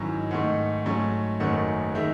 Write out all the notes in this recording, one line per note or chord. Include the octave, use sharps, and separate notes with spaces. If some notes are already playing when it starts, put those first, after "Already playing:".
Already playing: G#2 D#3 F#3 C#4 E4
G#2 D#3 A3 F#5
G#2 F#3 A3 C#4
F#1 F#2 D#3 A3 C#4 F#5
D#3 G#3 D#4 E5